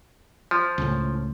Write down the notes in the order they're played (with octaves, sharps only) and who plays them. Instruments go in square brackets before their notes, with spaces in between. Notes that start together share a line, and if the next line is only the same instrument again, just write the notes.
[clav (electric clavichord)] F3
[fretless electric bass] C#2 A2